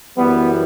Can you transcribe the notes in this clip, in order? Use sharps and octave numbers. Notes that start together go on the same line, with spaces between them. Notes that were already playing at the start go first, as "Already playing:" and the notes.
F#2 E3 G3 B3